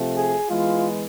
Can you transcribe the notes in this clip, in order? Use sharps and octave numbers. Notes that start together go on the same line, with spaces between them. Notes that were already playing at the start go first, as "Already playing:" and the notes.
Already playing: C3 F3 A3 C4
G#4
E3 G#3 B3 F4